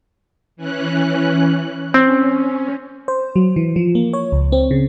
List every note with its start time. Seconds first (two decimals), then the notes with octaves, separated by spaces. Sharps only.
0.56 E3 C#4 F#6
1.94 C4 C#4
3.08 C5
3.36 F#3
3.56 E3
3.76 F3
3.95 A#3
4.13 C#5
4.32 C#2
4.52 C4
4.71 C#3